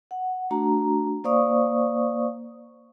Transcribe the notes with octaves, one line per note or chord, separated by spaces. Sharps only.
F#5
A3 D4 F#4 A#5
A#3 C5 D5 F5 C#6 D#6